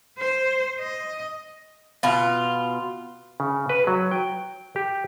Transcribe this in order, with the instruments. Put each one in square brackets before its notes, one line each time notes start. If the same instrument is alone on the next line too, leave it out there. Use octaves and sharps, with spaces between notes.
[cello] C5
D#5
[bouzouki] B2 F4
[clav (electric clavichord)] C#3
B4
F#3
G5
G4